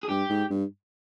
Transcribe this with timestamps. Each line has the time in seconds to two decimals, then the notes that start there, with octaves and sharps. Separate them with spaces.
0.03 G#4
0.09 G2 G4
0.30 G#2
0.50 G2